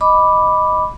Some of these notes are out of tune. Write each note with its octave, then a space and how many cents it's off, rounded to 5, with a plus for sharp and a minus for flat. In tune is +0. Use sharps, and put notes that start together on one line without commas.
D#5 +0 B5 +0 D6 +0